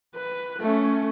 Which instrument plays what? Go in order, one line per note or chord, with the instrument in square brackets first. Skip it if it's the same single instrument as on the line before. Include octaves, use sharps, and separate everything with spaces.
[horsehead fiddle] B4
A3 C#4